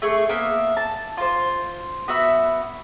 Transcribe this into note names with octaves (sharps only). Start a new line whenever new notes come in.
A3 G#4 C#6
A#3 B3 E5
A5
F4 C5
B3 F#4 E5 B5